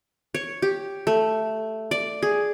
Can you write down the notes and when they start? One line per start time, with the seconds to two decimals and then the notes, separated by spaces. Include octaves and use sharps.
0.34 C#5
0.62 G4
1.07 A3
1.91 D5
2.22 G#4